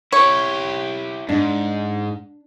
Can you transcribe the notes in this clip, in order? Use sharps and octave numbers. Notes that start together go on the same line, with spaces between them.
E4 G4 C#5
G#2 D4